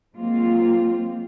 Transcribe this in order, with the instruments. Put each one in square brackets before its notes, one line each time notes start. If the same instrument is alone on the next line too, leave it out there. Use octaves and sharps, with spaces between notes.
[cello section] F3 F#3 G#3 A#3 C4 F4